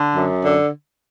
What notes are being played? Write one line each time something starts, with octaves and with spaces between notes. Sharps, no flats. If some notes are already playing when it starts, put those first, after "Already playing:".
Already playing: D3
F#2
D3